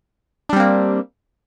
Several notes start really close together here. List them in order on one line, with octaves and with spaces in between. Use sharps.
D4 G3 C4 A#3